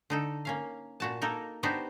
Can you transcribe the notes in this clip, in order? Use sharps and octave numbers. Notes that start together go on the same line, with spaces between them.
D3 D#4 A4
A#3 C#4 F5
A#2 F#4 A5
A#3 D#4 A4 A#4
B3 D4 D#4 F#4 G4 C5